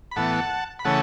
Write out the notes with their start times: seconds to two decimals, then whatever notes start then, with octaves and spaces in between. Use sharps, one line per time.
0.11 B5
0.16 A2 E3 B3 F#5 A5
0.79 B5
0.85 C#3 E3 A3 C#4 F#5 A5